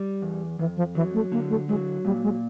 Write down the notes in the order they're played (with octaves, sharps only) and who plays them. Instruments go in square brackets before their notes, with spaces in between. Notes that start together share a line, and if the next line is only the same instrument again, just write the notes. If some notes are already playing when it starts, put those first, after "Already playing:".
Already playing: [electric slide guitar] G3
E2
[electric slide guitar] F2 [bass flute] E3
[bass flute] F3
[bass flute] E3 [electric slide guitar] F#3
[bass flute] A3
[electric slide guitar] D3 [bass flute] A#3
[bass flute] A3
[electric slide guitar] F#3 [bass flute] G#3
[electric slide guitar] A#2 [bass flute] G3
[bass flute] G#3